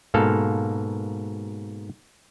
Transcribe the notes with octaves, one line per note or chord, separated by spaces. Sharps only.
G#2 B2 A#3 A4 F5